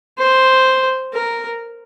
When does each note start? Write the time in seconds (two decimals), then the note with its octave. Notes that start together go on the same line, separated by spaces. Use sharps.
0.18 C5
1.13 A#4